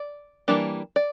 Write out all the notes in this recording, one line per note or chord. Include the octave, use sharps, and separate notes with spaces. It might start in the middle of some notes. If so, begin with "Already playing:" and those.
Already playing: D5
E3 G3 A#3 D4
D5